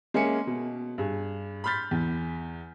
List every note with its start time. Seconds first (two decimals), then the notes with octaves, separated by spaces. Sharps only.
0.14 G#3 A#3 C#4 E5 G#5 C#7
0.47 B2
0.98 G2 G#4
1.64 B5 C6 F6 G6 A6 B6
1.91 E2